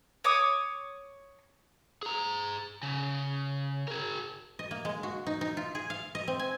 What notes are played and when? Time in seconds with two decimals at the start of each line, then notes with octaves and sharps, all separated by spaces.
0.24 C#5 D6 D#6
2.03 G#4 A#5
2.83 C#3
3.88 G#4 A#4
4.59 D#5
4.71 A#3
4.85 G#3
5.03 F#4
5.26 D#4
5.41 D#4
5.57 F4
5.75 G#4
5.90 F5
6.15 D#5
6.28 C4
6.39 G#5